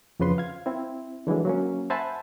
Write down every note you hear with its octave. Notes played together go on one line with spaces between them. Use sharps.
F2 C#3 F3 B4 C6
F5 G#6
C4 E4
D3 E3 F#3 G#3
F#3 A#3 C#4
C5 E5 F#5 G#5 A5 B5